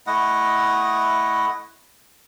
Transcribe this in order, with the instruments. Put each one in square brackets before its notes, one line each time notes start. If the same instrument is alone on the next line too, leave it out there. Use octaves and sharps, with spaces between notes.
[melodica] A3 E4 D#5 F#5